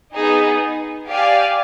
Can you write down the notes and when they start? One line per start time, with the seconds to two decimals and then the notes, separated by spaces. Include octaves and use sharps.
0.12 B3 D#4 G#4
1.07 G4 D5 F5 G#5